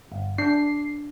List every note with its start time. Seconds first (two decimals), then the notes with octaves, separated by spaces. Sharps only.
0.12 G1
0.38 D4 C7